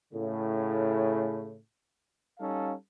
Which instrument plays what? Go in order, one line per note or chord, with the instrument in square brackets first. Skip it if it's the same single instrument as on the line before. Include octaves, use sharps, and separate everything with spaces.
[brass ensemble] A2 C#3
G3 C#4 D#4 A4 F5